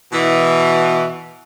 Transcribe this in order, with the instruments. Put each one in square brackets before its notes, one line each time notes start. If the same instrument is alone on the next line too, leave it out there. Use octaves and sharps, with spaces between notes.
[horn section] B2 E3